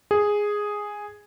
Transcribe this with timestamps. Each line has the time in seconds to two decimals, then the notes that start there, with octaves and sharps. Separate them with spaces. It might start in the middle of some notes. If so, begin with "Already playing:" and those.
0.11 G#4